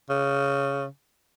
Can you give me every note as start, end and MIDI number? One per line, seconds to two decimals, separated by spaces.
0.09 0.86 49